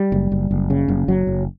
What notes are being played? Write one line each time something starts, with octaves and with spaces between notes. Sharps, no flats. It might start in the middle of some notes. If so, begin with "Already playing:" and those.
Already playing: G3
F#1
F#1
F#1
C#3
F#1
F#1 F#3
F#1